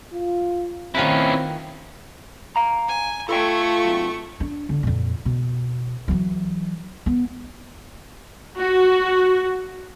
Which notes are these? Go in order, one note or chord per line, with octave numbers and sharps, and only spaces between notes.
F4
D#3 C4 C#4 E4 F4 B4
F5 A#5
G#5
A3 F4 A4 G5 C#6
C3 F#3
D4
D3
F2 A#2
B2
E3 F#3
B3
F#4